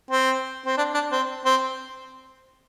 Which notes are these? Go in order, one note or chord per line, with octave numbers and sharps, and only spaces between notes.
C4
C4
D4
D4
C4
C4